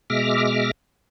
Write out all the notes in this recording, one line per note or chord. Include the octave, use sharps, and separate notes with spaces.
B2 G#3 E5 D6 F6 A#6